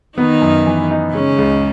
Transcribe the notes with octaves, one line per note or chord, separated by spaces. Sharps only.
D#3 B3 D#4
F#2
E3
D#4
C#3 G#3 C#4
C#2